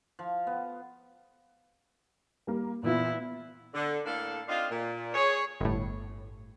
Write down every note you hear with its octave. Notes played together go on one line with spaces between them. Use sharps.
F3
B3
G3 A#3
A#2 E3 B3 E4 F4
D3
A2 A#3 D4 A4 F5
C4 D4 D#4 F4
A#2
G#4 C#5
G1 A2